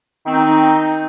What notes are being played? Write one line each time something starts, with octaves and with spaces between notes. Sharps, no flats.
D#3 C4 D#4